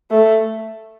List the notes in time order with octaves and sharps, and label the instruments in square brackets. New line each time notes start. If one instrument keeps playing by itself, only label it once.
[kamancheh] A3